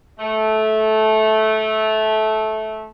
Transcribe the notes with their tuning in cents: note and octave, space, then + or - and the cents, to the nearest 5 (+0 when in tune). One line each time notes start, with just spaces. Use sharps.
A3 -15